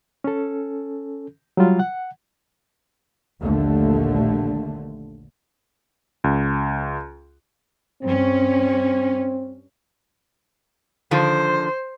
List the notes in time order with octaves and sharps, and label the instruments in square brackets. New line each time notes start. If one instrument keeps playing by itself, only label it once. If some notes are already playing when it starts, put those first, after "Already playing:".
[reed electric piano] C#4 A4
F#3 G3 F4
F#5
[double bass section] A#1 D#2 D3 A3
[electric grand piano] C#2
[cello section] G2 C#4 [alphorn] C4
[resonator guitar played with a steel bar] D3 D#3 F3 [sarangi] C5